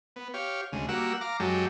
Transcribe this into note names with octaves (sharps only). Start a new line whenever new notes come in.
B3
G4 C#5 F5
D2 C#3 G#3
G3 A#3 F#4 F#5 E6
F5 A#5 D6
F#2 F#3 G#3 G4 A4